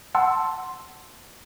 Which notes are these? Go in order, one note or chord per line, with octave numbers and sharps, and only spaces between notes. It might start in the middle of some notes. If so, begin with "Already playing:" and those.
F#5 A5 C6 E6